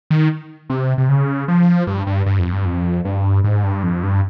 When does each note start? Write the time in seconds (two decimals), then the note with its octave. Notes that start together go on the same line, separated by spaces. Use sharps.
0.11 D#3
0.70 C3
0.98 C3
1.09 C#3
1.48 F3
1.87 G2
2.07 G2
2.26 G2
2.39 F2
2.53 G2
2.65 F2
3.05 G2
3.44 G#2
3.64 G2
3.83 F2
4.03 G2